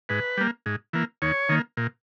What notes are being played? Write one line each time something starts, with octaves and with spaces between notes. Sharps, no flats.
G#2 B4
G3 A#3
G#2
E3 A#3
D#2 C#5
D#3 A#3
A#2